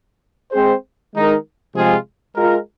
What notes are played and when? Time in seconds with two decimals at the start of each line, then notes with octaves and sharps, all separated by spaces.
0.51 G#3 C4 G#4 C5
1.13 D#3 G#3 D#4 A#4
1.74 C3 F3 G#3 F4 G#4
2.34 G#3 F4 A#4